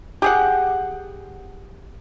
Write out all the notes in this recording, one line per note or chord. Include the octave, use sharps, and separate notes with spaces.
G4 G#4 F#5